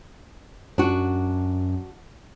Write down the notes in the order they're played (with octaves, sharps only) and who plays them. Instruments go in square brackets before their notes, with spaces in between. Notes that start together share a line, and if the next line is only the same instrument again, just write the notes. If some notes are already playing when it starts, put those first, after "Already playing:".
[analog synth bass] F#2 [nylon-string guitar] D4 F#4